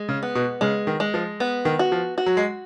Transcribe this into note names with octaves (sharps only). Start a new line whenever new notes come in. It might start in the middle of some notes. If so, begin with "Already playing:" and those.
Already playing: G#3
C#3
B3
B2
C#3 G#3
D#3
G#3
F3
B3
D#3
F#4
F3
F#4
F#3
G#3